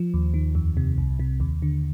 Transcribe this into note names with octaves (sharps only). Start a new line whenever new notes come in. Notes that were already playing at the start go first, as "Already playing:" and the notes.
Already playing: F3
D#2
D#3
F2
C3
C2
C3
D#2
D3